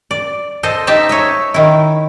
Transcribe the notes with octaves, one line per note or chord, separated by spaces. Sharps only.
D5
A4 C5 D#5
D#4 G4 E5 A5 A#5
C#5 D#5 E5
D#3 E4